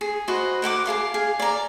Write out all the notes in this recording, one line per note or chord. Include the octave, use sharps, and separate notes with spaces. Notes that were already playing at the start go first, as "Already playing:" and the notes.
G#4
F#4 B4 C5 D#5
A#4 F#5 G5 D6
G#4 A4 F5 D6
G#4 F5
D5 A#5